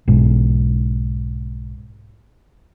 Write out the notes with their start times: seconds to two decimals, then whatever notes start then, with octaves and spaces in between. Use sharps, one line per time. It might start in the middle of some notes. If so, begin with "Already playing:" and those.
0.08 B1 G#2